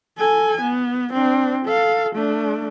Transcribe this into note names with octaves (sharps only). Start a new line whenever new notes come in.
A4 G#5
B3
C4 D4
A4 F5
A3 D4